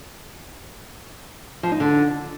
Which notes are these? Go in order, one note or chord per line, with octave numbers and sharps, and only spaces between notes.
F3
D#4
D3